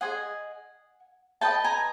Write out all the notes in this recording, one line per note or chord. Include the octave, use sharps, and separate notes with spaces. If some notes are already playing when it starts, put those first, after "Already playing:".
G#4 C5 D#5 F#5 G#5
F#4 B4 D#5 G5 A5
G#5 A#5